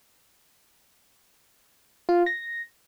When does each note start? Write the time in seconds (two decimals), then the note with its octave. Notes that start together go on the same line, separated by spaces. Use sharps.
2.09 F4
2.26 A#6